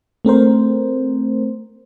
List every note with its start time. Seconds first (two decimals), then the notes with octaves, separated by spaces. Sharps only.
0.25 A3 C4 A#4 C5